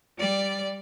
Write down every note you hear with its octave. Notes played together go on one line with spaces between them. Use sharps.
G3 D5